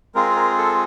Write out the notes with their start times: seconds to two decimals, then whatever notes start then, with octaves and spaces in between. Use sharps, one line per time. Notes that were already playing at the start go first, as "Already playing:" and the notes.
0.15 G#3 C4 F4 G#4 A#4
0.36 A#4
0.58 A4